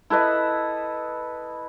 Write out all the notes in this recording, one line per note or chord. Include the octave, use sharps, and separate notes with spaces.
E4 A4 B4 D#5